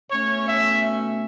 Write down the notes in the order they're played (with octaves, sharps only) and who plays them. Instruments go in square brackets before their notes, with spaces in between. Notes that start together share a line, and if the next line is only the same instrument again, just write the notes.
[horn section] B2 A3 C#4 C#5
E5